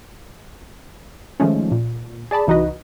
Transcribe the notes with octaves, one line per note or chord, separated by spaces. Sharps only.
D#3 F3 G#3 A3 C#4
A#2
G#4 D5 A5 B5
C2 E3 D#4 F#4 B4 D#5